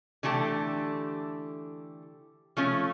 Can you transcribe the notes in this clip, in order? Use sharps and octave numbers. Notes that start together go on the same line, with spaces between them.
D3 E3 A3 G4 A5
F3 A3 C#4